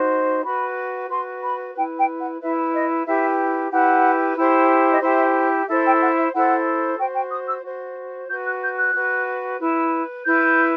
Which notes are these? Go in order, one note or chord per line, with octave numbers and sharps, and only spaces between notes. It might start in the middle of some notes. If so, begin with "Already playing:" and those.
Already playing: D#4 F#4 C5
F#4 B4 B5
F#4 B4 C6
B5
E4 B4 G5
G5
F#5
E4 B4 E5
D#5
E4 G4 B4 E5
E4 G4 B4 F#5
E4 G4 C5
D#5
E4 G4 C5 E5
E4 A4 C5 E5
G5
F#5
E5
E4 A4 C5 F#5
F#4 C5 G5
G5
D#6
E6
F#4 C5
F#4 B4 G6
F#6
G6
F#6
F#4 B4
E4 B4
E4 B4 G6